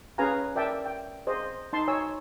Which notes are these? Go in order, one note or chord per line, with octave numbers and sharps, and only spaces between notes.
C#4 G#4 B4 F5 G#5 A#5
A#4 D5 E5 G5 A5
G5
G#4 C5 D#5
D#4 A5 C6
C#5 G#5 E6